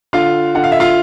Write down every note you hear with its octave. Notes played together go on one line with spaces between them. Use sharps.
D3 F4 F5
D3 F#5
F5
E5
F4 F5